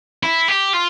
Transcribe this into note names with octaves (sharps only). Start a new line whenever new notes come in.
E4
G4
F4